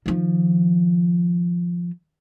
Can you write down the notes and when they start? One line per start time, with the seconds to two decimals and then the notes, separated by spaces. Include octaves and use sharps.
0.06 D#3 F3